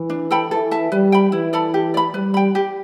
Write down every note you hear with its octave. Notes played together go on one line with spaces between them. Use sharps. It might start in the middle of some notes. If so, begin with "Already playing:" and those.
Already playing: E3
D4
A4 G5 B5
E3 A4
E5 A5
G3 B4
G5 B5
E3 E4
A4 D5 B5
G4
D5 B5
G3 B4
G5 B5
G4